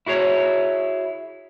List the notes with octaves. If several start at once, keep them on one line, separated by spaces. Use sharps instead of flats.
E4 F#4 G#4 C#5